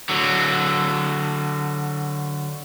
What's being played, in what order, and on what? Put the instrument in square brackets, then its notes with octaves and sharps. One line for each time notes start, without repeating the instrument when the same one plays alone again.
[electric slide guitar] D3 F#3